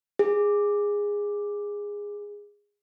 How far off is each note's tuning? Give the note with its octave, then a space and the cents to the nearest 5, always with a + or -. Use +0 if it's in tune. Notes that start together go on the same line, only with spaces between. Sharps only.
G#4 -15